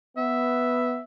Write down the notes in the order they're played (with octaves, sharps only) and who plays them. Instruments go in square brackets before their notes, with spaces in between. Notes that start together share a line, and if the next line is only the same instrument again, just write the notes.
[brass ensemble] B3 [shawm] E5